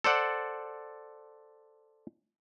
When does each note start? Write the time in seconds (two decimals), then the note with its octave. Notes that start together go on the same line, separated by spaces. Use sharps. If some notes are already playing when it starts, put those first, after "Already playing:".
0.04 A4 C5 D5 F#5